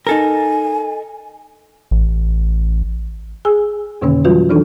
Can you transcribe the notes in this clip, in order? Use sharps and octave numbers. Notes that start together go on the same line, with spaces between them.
D#4 A4 A#4 G#5
A1
G#4 G#5 E6
F2 B2 D3 D#3 A#3 C#4
E3 F#3 G3 F4 F#4 B4
D#3 E3 D4 D#4 A4